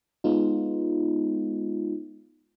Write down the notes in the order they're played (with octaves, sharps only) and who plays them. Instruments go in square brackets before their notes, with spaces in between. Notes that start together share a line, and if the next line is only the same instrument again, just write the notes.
[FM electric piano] G#3 B3 D#4 F4